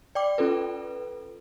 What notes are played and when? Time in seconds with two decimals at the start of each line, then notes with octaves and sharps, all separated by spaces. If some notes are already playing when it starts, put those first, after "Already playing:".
0.15 D5 G5 D6
0.38 C#4 F4 A4 B4